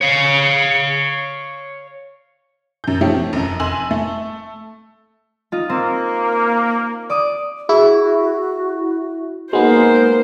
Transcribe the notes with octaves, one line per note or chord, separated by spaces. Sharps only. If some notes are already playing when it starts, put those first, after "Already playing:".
C#5 F5
F#2 G6
F3 A3 C#4 D#4 G4
F2
F1 F#2
F1 G#5 C6 E6 F#7
A3
D#4 F4
A#3 C4
D5 D6 D#6
E4 F#4 G#4
G#3 A#3 B3 D#4 F#4 C5